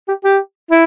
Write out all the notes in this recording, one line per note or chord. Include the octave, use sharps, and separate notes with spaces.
G4
G4
E4